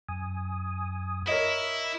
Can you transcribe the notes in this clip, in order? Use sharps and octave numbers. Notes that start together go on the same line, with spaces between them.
F#2 G#5 D#6
E4 A#4 C#5 D#5